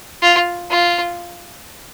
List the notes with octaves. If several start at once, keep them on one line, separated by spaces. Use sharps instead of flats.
F4
F4